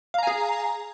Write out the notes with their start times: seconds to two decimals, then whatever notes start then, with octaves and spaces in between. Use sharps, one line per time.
0.14 F5
0.18 A#5
0.23 G#5
0.27 G#4